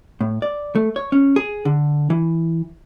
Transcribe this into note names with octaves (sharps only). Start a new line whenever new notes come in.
A2
D5
A3
C#5
C#4
G#4
D3
E3